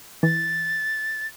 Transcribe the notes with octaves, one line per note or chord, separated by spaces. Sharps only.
E3 A6